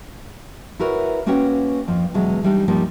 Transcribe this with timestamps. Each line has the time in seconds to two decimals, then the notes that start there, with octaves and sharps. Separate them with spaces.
0.80 E4 F#4 A#4 B4 C#5
1.26 A#3 C#4 F#4 B4 C#5 G5
1.88 F2 F3
2.14 E2 B2 F#3 G#3
2.43 E3 G3 D4 D#4
2.68 F3 G3 A#3 D#4